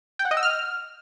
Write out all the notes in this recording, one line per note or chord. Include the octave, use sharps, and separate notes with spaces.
G5
F#5
D#5
E6
F6